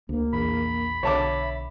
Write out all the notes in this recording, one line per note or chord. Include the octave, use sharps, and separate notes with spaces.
D2 A#3
A#1 E2 B5
B1 D3 C#5 E5 A5 D6